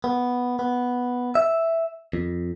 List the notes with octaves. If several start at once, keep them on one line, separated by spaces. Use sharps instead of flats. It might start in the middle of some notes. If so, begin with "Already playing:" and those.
B3
B3
E5
F2